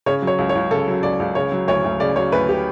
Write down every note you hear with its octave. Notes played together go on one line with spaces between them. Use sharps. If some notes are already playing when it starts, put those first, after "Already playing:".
C#3 C#5
F#3
C#5
C#2
C#5
C#2
C#3 A4
F#3
C#2 D5
C#2
C#3 C#5
F#3
D2 C#5
D2
C#3 D5
F#3 C#5
D2 B4
G4